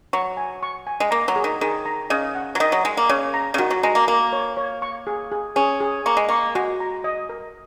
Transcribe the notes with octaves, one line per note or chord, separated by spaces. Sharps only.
F#3 C#6
G#5
C#6
G#5
G#3
A#3 A#5
F#3
G#4
D#3
D#3 G#4
A#5
C#3 D#5
F#5
F#3
D#3 D#5
F#3
G#3 D#5
A#3
C#3 C#5
A#5
C#3
D#3 F#4
F#3
G#3 A#5
A#3
A#3 A#4
C#5
C#5
C#6
G#4
G#4
C#4 G#4
G#4
A#3 C#6
G#3
A#3 C#6
G#3 F#4
A#5
D#5
A#4